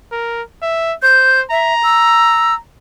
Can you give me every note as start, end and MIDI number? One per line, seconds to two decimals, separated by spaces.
0.12 0.42 70
0.62 0.93 76
1.03 1.43 72
1.03 1.40 91
1.51 1.75 76
1.51 2.58 82
1.83 2.54 88